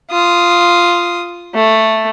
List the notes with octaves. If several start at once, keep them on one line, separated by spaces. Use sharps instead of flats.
F4 D#6
A3